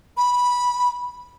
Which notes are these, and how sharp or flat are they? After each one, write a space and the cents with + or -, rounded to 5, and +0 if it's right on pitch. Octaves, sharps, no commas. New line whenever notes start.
B5 -10